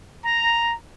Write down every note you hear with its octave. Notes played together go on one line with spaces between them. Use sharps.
A#5